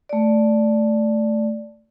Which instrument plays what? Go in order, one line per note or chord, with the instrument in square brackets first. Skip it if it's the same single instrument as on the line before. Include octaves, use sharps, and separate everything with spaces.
[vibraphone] A3 D5